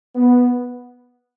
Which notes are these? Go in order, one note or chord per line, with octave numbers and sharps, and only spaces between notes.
B3